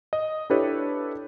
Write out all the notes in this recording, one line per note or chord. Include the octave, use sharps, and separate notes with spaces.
D#5
D4 E4 G4 A4 B4 C#5